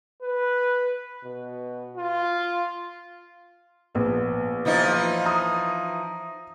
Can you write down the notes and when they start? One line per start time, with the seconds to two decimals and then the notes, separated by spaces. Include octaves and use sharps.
0.22 B4
1.24 B2
1.97 F4
3.95 A#1 B3
4.65 E3 F3 D#4
5.25 A#5 D#6